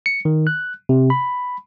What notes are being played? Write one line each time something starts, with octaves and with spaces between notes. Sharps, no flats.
C#7
D#3
F#6
C3
B5